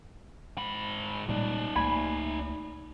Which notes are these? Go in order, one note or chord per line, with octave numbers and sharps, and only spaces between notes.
G#2 B5
A#2 G3 G#3 D#4 D5
C#2 A3 A#3 G#5 B5